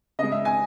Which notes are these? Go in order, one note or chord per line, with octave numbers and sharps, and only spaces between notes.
C#3 G#3 D#5
E5
G#5